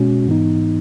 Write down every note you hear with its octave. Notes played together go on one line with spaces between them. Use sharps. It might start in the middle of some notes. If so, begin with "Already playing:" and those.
Already playing: B2 G#3 C#4 F#4
G#2 E3 B3 D#4